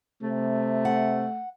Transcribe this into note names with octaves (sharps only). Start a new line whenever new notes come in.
C3 A3
F#5